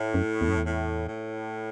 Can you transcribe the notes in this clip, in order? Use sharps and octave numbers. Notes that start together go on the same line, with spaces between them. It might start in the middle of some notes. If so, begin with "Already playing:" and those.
Already playing: A2
F#2
E2
F#2
E2
A2
A2